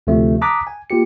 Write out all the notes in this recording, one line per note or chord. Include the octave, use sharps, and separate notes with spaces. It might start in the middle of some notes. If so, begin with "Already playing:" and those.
D2 C3 F3 A3
A5 A#5 D6 D#6 F#6 B6
G#5
A#3 F4 G4 C#7